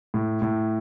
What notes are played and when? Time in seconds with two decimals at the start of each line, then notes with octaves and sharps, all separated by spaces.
0.14 A2
0.42 A2